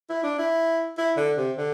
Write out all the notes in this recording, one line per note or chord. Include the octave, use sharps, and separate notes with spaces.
E4
D4
E4
E4
D3
C3
D3